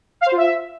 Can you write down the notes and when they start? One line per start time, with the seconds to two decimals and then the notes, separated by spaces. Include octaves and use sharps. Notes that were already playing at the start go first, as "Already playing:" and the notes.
0.21 F5
0.26 C5
0.32 F4
0.37 E5